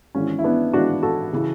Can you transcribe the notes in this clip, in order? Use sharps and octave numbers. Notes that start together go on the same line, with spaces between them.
G#1 G#2 E3 C#4
E4
B3 D4
G#1 G#2 E3 D4 F#4
F#4 A4
C#3 E3